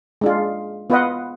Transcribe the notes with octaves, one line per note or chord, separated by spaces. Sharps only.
G#3 D4 F4
B3 F4 B4 D#5 F#5